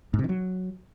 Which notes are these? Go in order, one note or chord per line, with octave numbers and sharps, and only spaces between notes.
G#2
C3
D#3
F#3